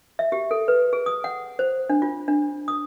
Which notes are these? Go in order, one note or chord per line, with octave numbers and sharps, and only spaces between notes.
E5
G4
A4
B4
G#4
D#6
F#5
C5
D4
F4
D4
D#6